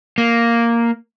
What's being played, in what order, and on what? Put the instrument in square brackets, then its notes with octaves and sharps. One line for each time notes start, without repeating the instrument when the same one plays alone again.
[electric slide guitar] A#3